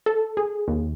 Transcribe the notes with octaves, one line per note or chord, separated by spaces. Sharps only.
A4
G#4
D#2